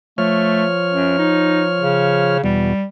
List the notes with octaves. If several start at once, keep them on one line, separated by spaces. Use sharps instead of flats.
F3 A3 C#5 F6
F#2
D#4
C#3
E2 B2 G3